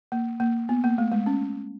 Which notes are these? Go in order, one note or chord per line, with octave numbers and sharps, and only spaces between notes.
A#3
A#3
B3
A#3
A3
G#3
C#4